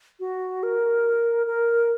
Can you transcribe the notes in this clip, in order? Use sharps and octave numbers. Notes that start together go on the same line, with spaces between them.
F#4
A#4
A#4